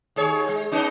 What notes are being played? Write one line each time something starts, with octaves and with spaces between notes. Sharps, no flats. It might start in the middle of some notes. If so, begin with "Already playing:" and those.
D#2 G#4 C#5
G#3
B3 C#4 D#4